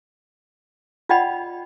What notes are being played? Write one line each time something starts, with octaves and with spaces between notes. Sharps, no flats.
F4 D5 D#5 F#5 G5 B5